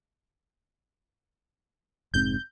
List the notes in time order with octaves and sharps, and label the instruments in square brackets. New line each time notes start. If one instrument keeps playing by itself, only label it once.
[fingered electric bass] F1 G#2 C4 [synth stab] G6